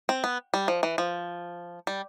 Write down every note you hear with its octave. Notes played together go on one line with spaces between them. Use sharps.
C4
B3
G3
F3
E3
F3
G3